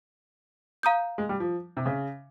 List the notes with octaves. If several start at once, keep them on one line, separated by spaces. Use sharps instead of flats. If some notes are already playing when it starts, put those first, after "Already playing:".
F5 A#5 D#6 G6
G#3
G3
F3
C3
C#3